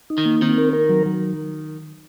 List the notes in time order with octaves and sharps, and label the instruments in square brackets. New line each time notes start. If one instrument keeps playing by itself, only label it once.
[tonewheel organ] D#4
[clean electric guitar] D#3
[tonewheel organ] A#3
[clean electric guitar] D#3 [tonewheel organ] C4
[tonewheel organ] A#4
A#4
F#3
F#3